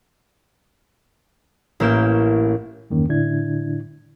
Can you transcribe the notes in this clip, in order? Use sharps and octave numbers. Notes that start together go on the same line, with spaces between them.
A1 A#3 C#4 E4 G6 E7
E2 G2 D#3 A#3 C#4
A2 D3 D4 E4 G#6